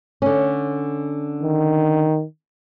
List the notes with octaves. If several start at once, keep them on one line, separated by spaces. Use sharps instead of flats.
D3 C#4
D#3